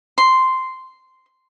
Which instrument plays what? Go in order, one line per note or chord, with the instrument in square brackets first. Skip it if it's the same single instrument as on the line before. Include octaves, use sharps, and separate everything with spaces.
[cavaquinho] C6